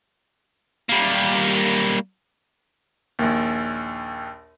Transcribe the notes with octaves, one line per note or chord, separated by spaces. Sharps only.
G3 A#3
A#1 D#2